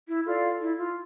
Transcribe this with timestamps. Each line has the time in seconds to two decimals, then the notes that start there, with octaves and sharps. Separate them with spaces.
0.08 E4
0.26 F4 A4 D5 F5
0.61 E4
0.78 F4